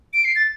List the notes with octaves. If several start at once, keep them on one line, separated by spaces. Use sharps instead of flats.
D7
C7
A6